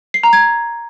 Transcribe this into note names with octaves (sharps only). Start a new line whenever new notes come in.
C7
A#5
G#6